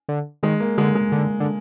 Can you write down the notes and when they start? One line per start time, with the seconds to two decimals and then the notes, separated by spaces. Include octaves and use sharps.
0.09 D3
0.43 D#3 G#3
0.60 A#3
0.78 D3 G#3
0.95 G#3
1.12 D3
1.40 D3